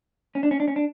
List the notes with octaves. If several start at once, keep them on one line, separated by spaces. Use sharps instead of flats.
C#4
D4
C#4
D4
C#4
D4